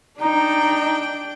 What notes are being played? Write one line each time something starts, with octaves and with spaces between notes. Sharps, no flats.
D4 D#4 G5 A#5